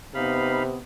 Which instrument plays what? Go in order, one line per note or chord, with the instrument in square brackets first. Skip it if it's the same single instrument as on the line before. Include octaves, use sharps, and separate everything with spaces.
[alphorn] C3 [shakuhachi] B3 [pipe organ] D#4 F5 B5